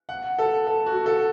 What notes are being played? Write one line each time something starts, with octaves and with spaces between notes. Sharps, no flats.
F#5
A4
A4
F#4
A4